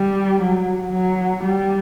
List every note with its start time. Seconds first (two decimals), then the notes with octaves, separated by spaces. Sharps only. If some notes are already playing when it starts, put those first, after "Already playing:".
Already playing: G3
0.41 F#3
0.92 F#3
1.43 G3